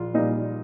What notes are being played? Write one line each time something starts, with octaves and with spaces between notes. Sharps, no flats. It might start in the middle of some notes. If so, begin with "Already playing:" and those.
Already playing: A#1 F4
A#2 G3 D#4